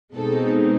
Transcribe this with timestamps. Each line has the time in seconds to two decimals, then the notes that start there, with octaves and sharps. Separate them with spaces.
0.15 B2 G#3 C4 D#4 A4